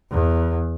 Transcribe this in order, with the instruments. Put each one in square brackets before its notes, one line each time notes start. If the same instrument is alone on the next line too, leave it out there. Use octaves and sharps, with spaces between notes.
[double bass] E2